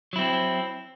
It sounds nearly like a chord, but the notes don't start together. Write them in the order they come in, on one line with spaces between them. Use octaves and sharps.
F#3 E4 C4